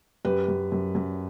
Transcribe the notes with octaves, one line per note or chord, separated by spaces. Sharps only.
F#2 G4 B4
F#2
F#2
F#2